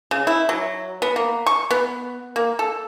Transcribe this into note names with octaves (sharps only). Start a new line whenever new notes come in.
C#3
E4
F#3
B3
A#3
C#6
B3
A#3
A4